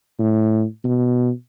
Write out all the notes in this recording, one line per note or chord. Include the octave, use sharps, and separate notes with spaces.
A2
B2